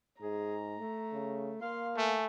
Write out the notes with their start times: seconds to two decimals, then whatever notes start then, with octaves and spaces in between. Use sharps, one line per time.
0.22 G#2 G#4 A#5
0.77 A3
1.13 C#3
1.62 A#3 F5 C6
1.97 A3 G#5